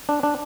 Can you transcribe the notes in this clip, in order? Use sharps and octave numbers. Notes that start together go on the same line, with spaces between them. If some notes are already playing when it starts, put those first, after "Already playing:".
D4
D4